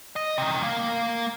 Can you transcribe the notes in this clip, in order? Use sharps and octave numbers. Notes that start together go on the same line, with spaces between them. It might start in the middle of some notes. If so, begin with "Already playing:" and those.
D#5
C3 D#3
A#3 F5